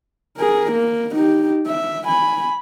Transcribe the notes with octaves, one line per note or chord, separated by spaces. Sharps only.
G#4 A#4
A#3
D#4 G4
E5
G#5 B5